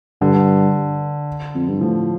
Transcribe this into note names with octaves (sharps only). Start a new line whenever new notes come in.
G2 D3
F2
G2
A2 F3